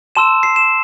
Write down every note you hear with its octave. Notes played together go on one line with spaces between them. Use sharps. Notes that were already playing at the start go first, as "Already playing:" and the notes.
A5 C6 E6 E7
C7
E7